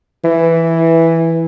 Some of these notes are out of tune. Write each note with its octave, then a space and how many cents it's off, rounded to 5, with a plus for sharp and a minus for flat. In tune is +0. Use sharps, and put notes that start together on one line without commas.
E3 +0